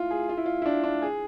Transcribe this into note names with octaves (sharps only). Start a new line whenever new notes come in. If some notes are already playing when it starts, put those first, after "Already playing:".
Already playing: E4 F4
G#4
F4
E4
F4
E4
D4
D4
G#4